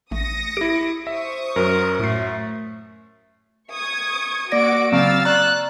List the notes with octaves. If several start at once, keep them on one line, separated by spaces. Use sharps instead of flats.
A1 A3 D#6 A#6 C#7
E4 G4 D7
C5 E5 C#6 D#6
F#2 F#3 A#4
A2 A3 C7
C#6 D#6 G#6
A#3 F#4 D5 D6 A#6 D7
C#3 F#3 C4 F5 E6 A6
D5 A#5 C#6 F#6